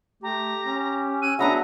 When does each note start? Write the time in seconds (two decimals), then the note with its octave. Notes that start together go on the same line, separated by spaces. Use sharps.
0.23 A3 G4 A#5
0.66 C#4
1.22 G#5 E6 F#6 D#7
1.39 F#3 B3 D4 G#4 E5 F#5 A#5